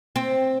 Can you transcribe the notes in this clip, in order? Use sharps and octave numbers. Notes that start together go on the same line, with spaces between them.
C4